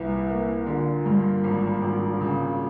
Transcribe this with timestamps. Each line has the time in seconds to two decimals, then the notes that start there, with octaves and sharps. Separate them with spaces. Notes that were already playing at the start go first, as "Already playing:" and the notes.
Already playing: C2 A#2 E3
0.29 A#3
0.66 A#2 D3
1.05 G2
1.44 G#1
1.82 G#1
2.21 C#3